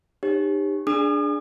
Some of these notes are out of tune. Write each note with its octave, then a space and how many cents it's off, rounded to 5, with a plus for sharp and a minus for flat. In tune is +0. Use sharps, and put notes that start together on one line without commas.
D#4 -30 G4 +20 C#5 -40
D4 +0 G#4 +0 D#6 -40